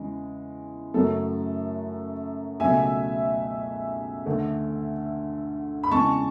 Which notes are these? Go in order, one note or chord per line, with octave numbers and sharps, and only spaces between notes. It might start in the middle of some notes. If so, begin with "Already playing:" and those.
Already playing: E2 C#3 E3 G#3
F#2 C#3 F#3 A3 A4
C#2 B2 F#3 A3 E5 G#5
D2 D3 A3
B5
E2 C#3 G#3 A5 C#6